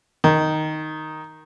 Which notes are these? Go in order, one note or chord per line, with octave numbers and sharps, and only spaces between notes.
D#3